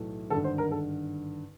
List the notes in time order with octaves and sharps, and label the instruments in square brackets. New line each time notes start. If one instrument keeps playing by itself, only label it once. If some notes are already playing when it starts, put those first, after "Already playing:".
Already playing: [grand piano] B1 A2 E3 A3
G#1 G2 D3 A4
C5
A#4
A4